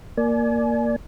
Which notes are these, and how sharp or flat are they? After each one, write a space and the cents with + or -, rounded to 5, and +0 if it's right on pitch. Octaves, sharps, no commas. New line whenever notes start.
A#3 +0 D5 +0 G#5 +35